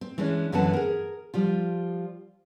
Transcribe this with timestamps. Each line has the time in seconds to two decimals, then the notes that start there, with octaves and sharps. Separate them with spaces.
0.01 C4
0.18 E3 G#3 C#4 D4
0.52 F#2 D3 E3 B3 F#5 A5
0.73 G#4 A#4
1.34 F3 G3 F4